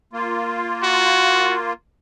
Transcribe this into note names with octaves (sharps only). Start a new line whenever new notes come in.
A#3 F4
F#4